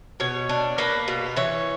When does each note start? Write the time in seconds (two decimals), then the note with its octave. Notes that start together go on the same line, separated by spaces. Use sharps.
0.20 B2 C#5
0.49 D4
0.78 A#3 B4
1.08 B2
1.36 E3 C#5